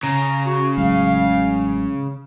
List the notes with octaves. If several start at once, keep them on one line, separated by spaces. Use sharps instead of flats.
C#3 A#5
F#4
A1 F#3 G#3 F5